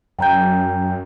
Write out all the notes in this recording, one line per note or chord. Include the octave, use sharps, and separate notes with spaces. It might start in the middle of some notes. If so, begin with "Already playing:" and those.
F#2 G5 A#5 G6